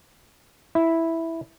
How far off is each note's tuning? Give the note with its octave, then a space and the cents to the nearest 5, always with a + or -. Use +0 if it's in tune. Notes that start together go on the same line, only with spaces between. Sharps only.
E4 -5